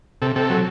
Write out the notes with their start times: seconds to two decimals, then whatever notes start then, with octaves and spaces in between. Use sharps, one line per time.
0.22 C3 A4
0.36 C3 A4
0.50 F#3